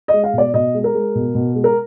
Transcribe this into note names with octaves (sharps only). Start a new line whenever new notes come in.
D#5
G#3
F5
B2 D5
B2 D#5
G#3
A#4
G#3
B2
B2
G#3
A#4